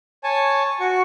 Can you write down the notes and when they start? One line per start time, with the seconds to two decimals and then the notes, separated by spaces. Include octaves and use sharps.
0.24 C#5 G#5 A5
0.80 F#4 C#6